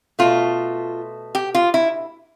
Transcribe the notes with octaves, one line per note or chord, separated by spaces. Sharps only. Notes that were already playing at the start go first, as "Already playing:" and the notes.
B2 A3 F4
G4
F4
E4